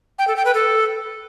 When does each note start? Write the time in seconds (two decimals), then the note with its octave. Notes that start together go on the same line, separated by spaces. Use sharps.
0.18 G5
0.27 A4
0.36 G5
0.45 B4
0.54 A4